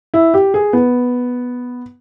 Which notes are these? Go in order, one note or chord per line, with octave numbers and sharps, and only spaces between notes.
E4
G4
G#4
B3